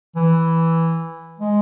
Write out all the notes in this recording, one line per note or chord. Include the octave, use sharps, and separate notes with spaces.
E3
G#3